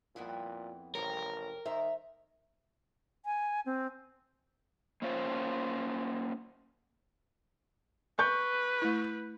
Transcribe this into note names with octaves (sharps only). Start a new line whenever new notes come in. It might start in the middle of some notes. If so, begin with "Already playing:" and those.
F2 A#2 B3 E4
A1 F2 C3 A#4 C#5
D#3 C5 E5 A#5
G#5
C4
A#3 C#4 F4 C5
B4 C#6 G6
A3 E4